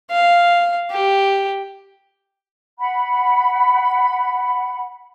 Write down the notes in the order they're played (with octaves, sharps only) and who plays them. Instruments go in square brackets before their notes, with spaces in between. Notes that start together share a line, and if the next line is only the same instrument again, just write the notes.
[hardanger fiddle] F5
G4
[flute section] F#5 B5